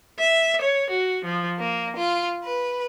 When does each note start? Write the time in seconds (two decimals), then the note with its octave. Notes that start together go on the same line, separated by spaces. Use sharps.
0.19 E5
0.60 C#5
0.89 F#4
1.24 F3
1.60 A#3
1.97 F4
2.45 B4